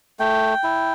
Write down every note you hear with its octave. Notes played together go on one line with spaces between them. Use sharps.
A3 G5
E4